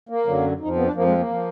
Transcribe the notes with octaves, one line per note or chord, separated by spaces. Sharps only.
A#3
F#2 D3 F#3
F2 D#4
F3
B3
D4
F2 F3 A#3
G#3
A#3
F3